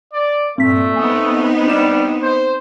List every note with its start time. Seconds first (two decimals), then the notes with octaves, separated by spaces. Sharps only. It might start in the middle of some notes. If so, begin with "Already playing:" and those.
0.13 D5
0.58 G2 A#2 A3 C4 B6
0.96 B3 C4 D#4 G#5 D#6
1.67 G3 D4 E7
2.22 C5